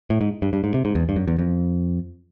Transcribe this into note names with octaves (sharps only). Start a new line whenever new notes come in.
A2
G#2
G2
G2
G#2
C3
G#2
E2
G2
F#2
E2
F2